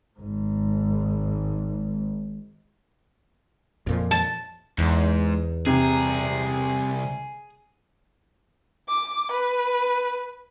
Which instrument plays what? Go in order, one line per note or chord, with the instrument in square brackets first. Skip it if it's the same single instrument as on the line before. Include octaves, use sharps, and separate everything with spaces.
[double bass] G#1 G#2
[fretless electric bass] F2 A#2 F3
[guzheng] A5
[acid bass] E2 [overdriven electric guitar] G#2
[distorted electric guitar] C2 A#5 [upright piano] C3 [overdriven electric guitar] G#4
[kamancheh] D6
B4